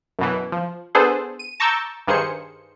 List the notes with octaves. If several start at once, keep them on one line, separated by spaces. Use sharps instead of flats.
F#2 B2 E3
F3
B3 D4 G#4 A4 C5
D#7
A5 A#5 C#6 D6 E6 G6
G2 D#3 G#4 C5 C#7